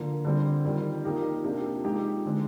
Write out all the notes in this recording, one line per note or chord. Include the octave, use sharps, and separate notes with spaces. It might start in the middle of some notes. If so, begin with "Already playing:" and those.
Already playing: D3 F3 A#3
D3 G3 C4
F2 D#3 G3
F3 A#3 D#4 G4 A#4
C3 F3 A#3 D4 G4
F3 G#3 D#4 G4
D3 G#3 C4